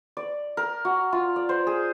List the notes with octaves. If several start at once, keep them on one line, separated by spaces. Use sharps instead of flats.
D5
A#4
F#4
F4
D5
C5
G#4